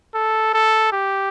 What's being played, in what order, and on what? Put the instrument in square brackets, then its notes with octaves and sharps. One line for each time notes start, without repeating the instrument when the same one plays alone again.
[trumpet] A4
A4
G4